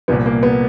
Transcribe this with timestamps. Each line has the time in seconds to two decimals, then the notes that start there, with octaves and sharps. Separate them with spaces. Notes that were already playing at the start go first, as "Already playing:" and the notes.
0.08 C2 A#2 F3 B3
0.26 A#3
0.43 B3